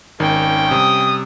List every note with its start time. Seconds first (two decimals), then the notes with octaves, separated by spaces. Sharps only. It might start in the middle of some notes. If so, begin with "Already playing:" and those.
0.20 G#1 D#3 C#4 G5
0.71 C3 G3 D#6